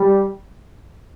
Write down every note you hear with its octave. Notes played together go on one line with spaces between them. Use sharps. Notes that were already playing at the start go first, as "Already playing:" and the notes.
Already playing: G3